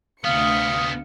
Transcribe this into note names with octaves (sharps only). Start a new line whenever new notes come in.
D2 C3 B3 F5 D#6 C#7